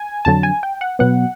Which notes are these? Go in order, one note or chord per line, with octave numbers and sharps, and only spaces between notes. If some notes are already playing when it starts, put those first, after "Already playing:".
Already playing: G#5
F2 D3 F#3 A5
G#5
G5
F#5
B2 F#3 B3 F#5